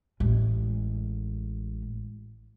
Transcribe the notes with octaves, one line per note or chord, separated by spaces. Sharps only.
A1 G#3